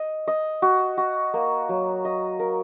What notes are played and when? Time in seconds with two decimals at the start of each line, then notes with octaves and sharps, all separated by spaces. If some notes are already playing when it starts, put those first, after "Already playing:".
Already playing: D#5
0.28 D#5
0.62 F#4
0.98 F#4
1.34 A#3
1.69 F#3
2.05 D#5
2.40 A#4